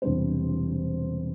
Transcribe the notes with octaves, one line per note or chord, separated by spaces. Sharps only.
E1 E2 C3 G3 D4 C5